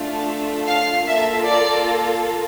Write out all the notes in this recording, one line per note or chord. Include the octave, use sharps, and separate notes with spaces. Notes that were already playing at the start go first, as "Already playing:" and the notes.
Already playing: A3 D4 F4 A4
F5
A#3 F4 A4 E5
D5